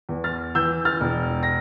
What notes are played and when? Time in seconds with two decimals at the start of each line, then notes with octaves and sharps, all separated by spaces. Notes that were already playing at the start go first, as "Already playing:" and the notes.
0.09 E2
0.24 F6 A6
0.55 E3 E6 G6
0.85 F6 A6
1.01 E1
1.43 A#6